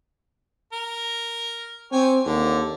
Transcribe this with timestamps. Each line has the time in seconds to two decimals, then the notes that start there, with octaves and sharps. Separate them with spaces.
0.73 A#4
1.92 C4 G4 C#5 G#5
2.26 D#2 D3